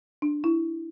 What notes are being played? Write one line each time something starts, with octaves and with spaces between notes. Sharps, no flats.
D4
E4